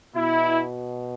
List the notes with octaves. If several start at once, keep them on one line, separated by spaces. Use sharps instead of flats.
B2 E4